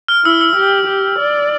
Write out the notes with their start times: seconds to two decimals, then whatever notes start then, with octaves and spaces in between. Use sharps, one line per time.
0.08 F6
0.25 E4 E6
0.41 E6
0.56 G4
0.87 G4
1.19 D5